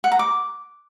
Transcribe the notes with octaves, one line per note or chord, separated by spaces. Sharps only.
F#5
A#5
D6